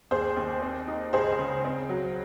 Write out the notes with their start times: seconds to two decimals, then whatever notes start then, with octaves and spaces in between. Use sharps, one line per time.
0.11 D#2 G#4 C5
0.37 D#2
0.62 C4
0.88 D#4
1.13 C#2 G#4 C5
1.39 C#3
1.65 C4
1.90 F#3